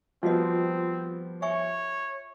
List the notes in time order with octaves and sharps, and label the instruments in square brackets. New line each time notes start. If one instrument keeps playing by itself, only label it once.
[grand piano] F3 G3 B3 [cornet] C4 [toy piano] F4 F#4 D#5
[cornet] C#5 [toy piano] E5 G#5 C#6